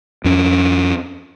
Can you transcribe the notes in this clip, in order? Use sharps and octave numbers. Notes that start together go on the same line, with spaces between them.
F2 C#4